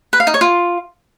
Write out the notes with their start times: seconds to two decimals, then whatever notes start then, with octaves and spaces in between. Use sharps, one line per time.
0.13 B4
0.20 F5
0.27 D#4
0.34 C#5
0.41 F4